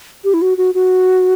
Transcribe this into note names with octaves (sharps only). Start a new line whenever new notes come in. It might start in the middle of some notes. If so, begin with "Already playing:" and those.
G4
E4
F#4
F#4
F#4